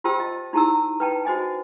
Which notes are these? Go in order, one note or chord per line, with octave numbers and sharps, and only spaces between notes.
F4 G4 C5 G5 A5 E6
D#5
D#4 E4 G4 A5 A#5 E6
B4 G5 A5
F#4 C5 D#5 G#5